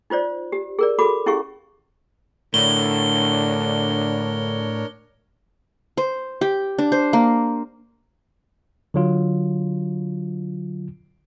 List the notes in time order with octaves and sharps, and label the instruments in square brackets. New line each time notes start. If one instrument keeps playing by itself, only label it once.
[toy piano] D#4 F4 C5 D5
G4
G#4 A#4 D5
F#4 A4 B5 D6
C#4 E4 G4 G#4 F5 C#6
[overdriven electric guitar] A2 [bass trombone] D3 [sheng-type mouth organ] D4 A#4 C#5 [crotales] G7
[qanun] C5
G4
D4
C5
A#3
[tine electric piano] D3 F#3 F4